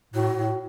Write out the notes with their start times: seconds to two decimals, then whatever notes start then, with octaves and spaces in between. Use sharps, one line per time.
0.14 A2 F#4
0.36 A2